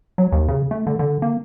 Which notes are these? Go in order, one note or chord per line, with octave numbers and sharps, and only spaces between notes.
F#3
D#2
C#3
A3
D3
D3
A#3